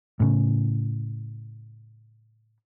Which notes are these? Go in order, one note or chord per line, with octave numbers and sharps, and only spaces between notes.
A2 C#3